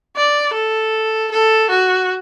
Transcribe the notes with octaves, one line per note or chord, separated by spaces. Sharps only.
D5
A4
A4
F#4